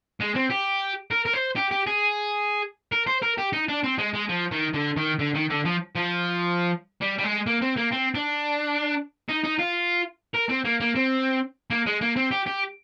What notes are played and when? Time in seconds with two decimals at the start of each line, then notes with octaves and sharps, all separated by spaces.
0.20 G#3
0.35 C4
0.50 G4
1.11 A#4
1.25 A#4
1.33 C5
1.56 G4
1.71 G4
1.87 G#4
2.92 A#4
3.07 C5
3.22 A#4
3.38 G4
3.53 D#4
3.68 D4
3.83 C4
3.98 G#3
4.14 G#3
4.29 F3
4.51 D#3
4.74 D3
4.97 D#3
5.19 D3
5.34 D#3
5.50 D3
5.65 F3
5.95 F3
7.01 G3
7.18 G3
7.24 G#3
7.47 A#3
7.62 C4
7.77 A#3
7.92 C4
8.15 D4
9.29 D#4
9.44 D#4
9.59 F4
10.35 A#4
10.49 C4
10.65 A#3
10.80 A#3
10.95 C4
11.70 A#3
11.86 G#3
12.01 A#3
12.16 C4
12.31 G4
12.46 G4